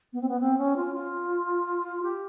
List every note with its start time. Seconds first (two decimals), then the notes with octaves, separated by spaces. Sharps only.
0.13 B3
0.21 C4
0.28 B3
0.40 C4
0.58 C#4
0.76 F4
0.94 F4
2.03 G4